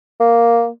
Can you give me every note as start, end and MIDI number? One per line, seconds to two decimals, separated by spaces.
0.20 0.67 58